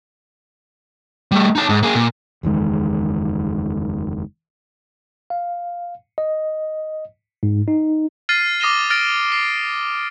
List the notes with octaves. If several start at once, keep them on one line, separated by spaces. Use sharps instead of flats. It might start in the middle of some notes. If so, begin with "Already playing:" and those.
G3 A3
D#4 A5
G#2
A#3 G#4
A#2
F#1 E2 D#3 G#3
F5
D#5
G#2
D#4
F6 A6 C7 D#7
D6 D#6 A#6 D#7 E7 G7
F6 A6 A#6 D7
C7